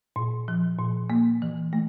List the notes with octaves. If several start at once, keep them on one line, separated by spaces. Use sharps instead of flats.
A#2
F3
A#2
A#3
E3
A3